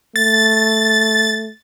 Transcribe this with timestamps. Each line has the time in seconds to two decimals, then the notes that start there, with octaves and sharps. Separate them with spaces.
0.16 A3 A6